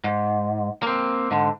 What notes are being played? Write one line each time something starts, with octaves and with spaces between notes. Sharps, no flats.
G#2
A#3 C4
G#2 D3